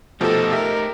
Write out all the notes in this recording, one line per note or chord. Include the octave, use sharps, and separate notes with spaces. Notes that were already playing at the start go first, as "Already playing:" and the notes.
B2 F3 A3 D#4 G4 A4
G4 A#4 E5